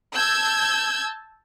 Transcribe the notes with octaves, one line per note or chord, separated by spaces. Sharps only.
A5 E6 G6 G#6